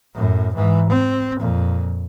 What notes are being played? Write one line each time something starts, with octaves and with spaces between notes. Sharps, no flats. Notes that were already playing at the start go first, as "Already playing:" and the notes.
F#2 A2
G#2 E3
C4
F2 A#2